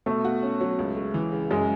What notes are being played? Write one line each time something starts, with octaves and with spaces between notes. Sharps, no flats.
B2 A3
F#4
C#4
F#3
C#2
G#3
E3
C#3
F#2 G#3